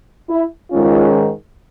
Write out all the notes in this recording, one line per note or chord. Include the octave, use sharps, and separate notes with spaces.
E4
G#2 D#3 G#3 C#4 F4